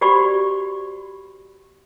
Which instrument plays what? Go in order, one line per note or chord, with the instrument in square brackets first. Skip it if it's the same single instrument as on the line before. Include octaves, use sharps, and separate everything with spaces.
[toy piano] F#4 G4 C5 D5 B5 C#6